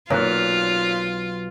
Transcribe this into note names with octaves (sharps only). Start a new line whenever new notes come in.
B1 A#2 F4 C#5 F#6